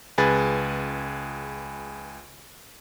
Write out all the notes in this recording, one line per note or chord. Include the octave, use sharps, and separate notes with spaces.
C#2 G#4 B4 A6